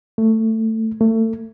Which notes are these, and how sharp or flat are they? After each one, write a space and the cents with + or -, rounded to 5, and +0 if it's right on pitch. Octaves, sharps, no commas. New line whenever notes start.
A3 +15
A3 +30